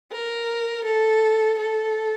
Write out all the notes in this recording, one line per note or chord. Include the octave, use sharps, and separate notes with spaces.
A#4
A4
A4